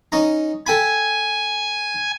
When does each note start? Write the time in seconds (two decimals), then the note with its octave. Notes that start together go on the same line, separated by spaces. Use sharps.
0.12 C#4 D#4 A#5
0.67 A4 G5 G#5 B5